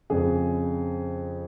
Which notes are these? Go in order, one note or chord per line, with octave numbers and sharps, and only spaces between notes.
F2 C#3 G#4